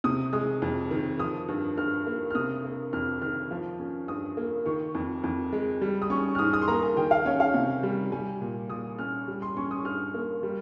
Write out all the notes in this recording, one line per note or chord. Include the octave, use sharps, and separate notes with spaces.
C3 D#6
G#3 D#6
F2
D#3
F3 D#6
G2
G2 F6
A#3
F6
C3 D#6
A#3
F2 F6
D#3 F6
F3
C#4
G2 D#6
A#3
D#3 C#6
F2
F2
G#3
G3
D#6
C#4 C#6
F6
G#2 D#6
D#6
C6
A#3 A#5
G#5
D#3 G5
F5
C#4 C#5
F5
C3
G3
G3 G#5
A#2
A#2 D#6
C#4 F6
G3
C6
C#4 C#6
D#6
G2 F6
A#3
G3